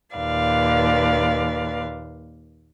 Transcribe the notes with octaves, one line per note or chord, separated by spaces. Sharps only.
D#2 A#2 B4 D5 F5